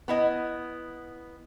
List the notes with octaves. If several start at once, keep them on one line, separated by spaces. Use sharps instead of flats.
B3 E4 D#5